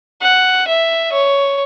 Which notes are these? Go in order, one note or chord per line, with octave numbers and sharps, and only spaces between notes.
F#5
E5
C#5